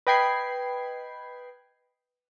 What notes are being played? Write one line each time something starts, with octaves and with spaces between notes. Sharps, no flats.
B4 D#5 G5 B5 G#6 C7